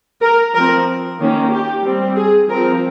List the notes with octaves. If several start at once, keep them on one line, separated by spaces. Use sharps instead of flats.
A#4
F3 C4 A#4
D#3 A#3 C#4
G4
G3 C4
G#4
F3 C4 A#4